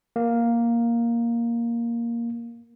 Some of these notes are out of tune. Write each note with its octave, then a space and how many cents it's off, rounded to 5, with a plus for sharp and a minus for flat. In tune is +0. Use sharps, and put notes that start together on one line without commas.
A#3 +5